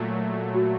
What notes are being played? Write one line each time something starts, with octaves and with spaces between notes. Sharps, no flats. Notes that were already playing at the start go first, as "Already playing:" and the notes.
Already playing: A#2 F#3 A3
F#4